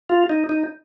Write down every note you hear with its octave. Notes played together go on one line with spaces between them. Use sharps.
F4
D#4
D#4